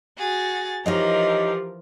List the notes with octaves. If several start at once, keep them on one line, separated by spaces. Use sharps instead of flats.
F#4 G#4 A6
E3 F3 D#4 G4 A#4 C#5 D#5